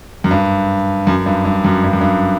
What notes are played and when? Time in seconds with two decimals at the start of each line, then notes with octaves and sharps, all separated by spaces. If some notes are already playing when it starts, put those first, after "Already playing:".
0.24 F#2
0.31 G2
1.07 F#2
1.26 G2
1.45 G2
1.64 F#2
1.84 G2
1.93 F#2
2.01 G2